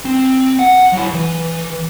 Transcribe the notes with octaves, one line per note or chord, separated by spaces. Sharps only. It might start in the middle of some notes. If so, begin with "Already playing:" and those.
C4
F#5
F#3 E4
E3